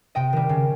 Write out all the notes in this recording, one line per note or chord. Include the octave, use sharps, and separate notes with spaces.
C3 D#5 G5
D#3 G3
C#3